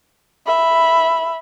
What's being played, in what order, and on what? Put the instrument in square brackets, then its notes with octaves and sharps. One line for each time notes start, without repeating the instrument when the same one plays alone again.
[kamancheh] E5 B5